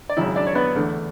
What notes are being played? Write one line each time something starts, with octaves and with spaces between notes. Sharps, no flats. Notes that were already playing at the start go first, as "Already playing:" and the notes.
D5
G#1 F#2 C#3 E4 E5
D4 D5
C#5
B3 B4
E2 D3 A3